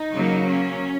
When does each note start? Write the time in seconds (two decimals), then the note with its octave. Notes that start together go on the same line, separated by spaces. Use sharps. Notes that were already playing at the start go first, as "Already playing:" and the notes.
Already playing: D#4
0.13 C#3 F#3 A#3
0.46 C#4